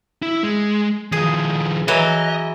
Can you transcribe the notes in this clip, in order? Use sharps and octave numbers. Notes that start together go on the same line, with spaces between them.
E4
G#3
D#3 F3 G#4
E3 F#3 D#5